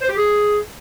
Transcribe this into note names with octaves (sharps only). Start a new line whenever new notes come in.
C5
G4
G#4